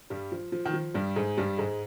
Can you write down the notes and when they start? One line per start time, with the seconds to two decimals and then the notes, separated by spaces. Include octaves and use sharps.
0.10 G2 G3
0.32 F3
0.52 F3
0.65 D#3
0.73 F3
0.94 G2 G3
1.16 G#2 G#3
1.37 G2 G3
1.58 G#2 G#3